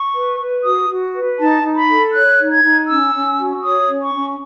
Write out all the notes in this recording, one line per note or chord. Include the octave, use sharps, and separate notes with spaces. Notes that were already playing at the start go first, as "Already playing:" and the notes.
Already playing: C#6
B4
B4
F#4 D#6
F#4
B4
D#4 A5
D#4
B5
A4
C#5 F#6
D#4
G#6
D#4
C#4 E6
C#4
F#4
C#5 D#6
C#4
C#6
C#4